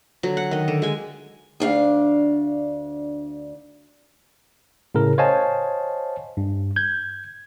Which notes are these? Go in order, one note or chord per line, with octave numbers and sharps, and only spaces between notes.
D3 F#3
F#5
D#3 D#5
D3
G#3 G#5
D2 D4 F5
A2 C#3 A#4
C5 C#5 D#5 F5 G#5 A5
G2
G6 G#6